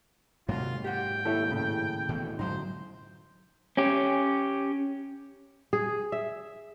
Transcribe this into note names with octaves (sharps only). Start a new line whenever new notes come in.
G#2 C3 D#3 F#3 A#3 F4 F#4
G4 F#5 G5
D#2 E4 G4 A4 C#5 E5
A2 C#3
B2 E3 A3
G#2 D3 F#3 D#4 C5
C#4 G4
G#4
E5